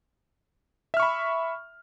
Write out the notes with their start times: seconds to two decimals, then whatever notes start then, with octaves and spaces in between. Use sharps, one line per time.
0.94 E5
0.97 F6
1.00 C#6
1.02 B5